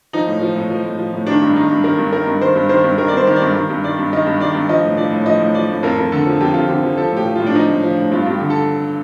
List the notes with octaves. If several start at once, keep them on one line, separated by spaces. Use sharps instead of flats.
F3 D#4
A2
F3
A2
F3
A2
F3
A2
D#3 D4
G2
D#3 D#4
G2
D#3 A#4
G2
D#3 A#4
G2
D#3 C5
G2
D#3 C5
G2
D#3 A#4
D5
G2 C5
D#3
D5
G2
D#3
G2
D#3 D5
G2
D#3 D#5
G2
D#3 D5
G2
F3 D#5
A2
F3 D5
A2
F3 D#5
A2
F3 D5
A2
F2 A#4
F2
D3 A4
F3
F2 G4
F2 F4
D3 G4
F3
F3 A4
A2 G4
F3
A2 F4
D4
F3 D#4
A2
F3
A2
G2 F4
F4
G2 G4
D3
A4